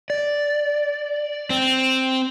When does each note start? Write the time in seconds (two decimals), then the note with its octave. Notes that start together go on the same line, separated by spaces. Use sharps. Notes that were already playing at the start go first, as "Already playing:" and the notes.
0.10 D5
1.50 C4